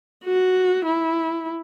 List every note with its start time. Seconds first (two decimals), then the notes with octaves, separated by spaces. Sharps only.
0.24 F#4
0.85 E4